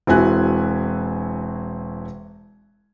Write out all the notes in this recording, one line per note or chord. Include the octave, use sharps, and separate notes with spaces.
E1 C4 E4 F#4 G#5 F#6